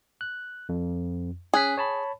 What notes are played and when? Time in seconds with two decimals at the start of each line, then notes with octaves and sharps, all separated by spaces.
0.21 F#6
0.69 F2
1.54 C#4 G#4 F#6 B6
1.78 C#5 A5 B5